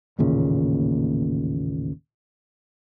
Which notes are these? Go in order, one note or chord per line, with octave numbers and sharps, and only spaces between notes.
A1 D#2 A#2 C#3